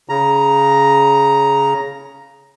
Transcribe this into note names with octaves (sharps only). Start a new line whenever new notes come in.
C#3 A#5